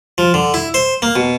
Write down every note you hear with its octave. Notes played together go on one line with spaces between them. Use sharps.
F3
D3
E4
C5
A#3
B2